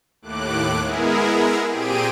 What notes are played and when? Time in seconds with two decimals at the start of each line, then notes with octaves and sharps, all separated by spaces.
0.22 D#2 A2 D6 F#6
0.81 G#3 B3 E4 G#4 A#4
1.70 A#2 C4 G4 G#4 D7 D#7